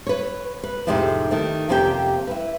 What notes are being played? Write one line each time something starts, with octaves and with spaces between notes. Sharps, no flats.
B4 C#5
B4
F2 A2 C3 G#3 D4 D#4
D#3 A3
F2 C3 A#3 C#4 G4 G5
E4 B4